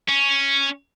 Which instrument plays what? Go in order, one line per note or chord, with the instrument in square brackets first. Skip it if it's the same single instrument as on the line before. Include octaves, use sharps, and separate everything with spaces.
[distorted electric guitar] C#4